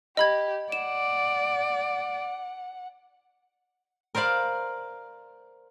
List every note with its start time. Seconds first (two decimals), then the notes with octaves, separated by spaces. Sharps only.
0.17 G4 D#5 B5 G#6
0.72 D5 F#5 E7
4.15 A#4 C5 D5 F5 B5